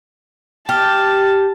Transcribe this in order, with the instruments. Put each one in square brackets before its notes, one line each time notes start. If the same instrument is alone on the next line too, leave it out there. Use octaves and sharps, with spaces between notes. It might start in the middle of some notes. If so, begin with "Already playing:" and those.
[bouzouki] G4 [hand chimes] G5 F6 [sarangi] A5